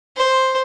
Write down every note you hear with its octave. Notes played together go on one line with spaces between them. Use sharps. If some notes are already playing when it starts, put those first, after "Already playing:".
C5